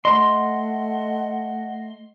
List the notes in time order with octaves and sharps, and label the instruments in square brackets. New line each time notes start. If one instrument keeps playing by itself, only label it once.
[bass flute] A3 [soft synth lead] D#5 [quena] F#5 [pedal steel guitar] C6